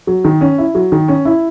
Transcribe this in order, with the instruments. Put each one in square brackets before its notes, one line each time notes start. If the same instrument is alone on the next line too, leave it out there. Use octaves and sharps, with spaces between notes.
[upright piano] F#3
D#3
C#4
E4
F#3
D#3
C#4
E4